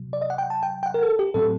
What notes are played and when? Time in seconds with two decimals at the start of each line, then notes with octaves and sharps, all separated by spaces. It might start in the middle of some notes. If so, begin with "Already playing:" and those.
Already playing: C3 F#3
0.13 D5
0.22 D#5
0.30 F#5
0.38 G5
0.50 A5
0.63 G5
0.83 G5
0.86 F#5
0.94 A#4
1.03 A4
1.19 G4
1.34 A2 F#3 C4 A4